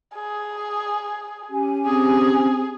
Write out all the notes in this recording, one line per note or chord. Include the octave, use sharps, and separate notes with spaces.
G#4
C#4 G4 G#5
C4 G#4